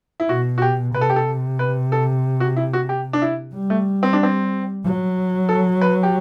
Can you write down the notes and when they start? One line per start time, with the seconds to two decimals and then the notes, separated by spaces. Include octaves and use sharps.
0.20 E4
0.29 B2 F#4
0.58 F#4
0.62 G4
0.94 C3 B4
1.01 A4
1.10 G4
1.16 A4
1.59 B4
1.92 A4
2.40 F#4
2.57 E4
2.73 F#4
2.89 G4
3.13 D4
3.22 E4
3.54 G3
3.70 A3
4.03 C4
4.13 D4
4.23 C4
4.84 F#3
5.49 A4
5.81 B4
6.03 G4